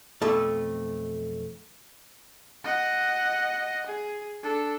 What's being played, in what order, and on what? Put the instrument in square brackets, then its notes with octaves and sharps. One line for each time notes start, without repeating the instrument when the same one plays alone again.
[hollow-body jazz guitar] B1 F2 A3 A4
[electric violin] D#5 F#5
G#4
D4 A4